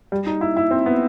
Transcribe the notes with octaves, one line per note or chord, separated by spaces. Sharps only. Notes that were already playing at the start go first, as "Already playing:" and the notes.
G3
D#4
E4
E4
C4
B3